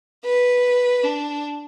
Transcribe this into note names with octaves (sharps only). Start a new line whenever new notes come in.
B4
D4